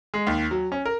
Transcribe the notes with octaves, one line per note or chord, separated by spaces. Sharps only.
G#3
D#2
F#3
C#4
A#4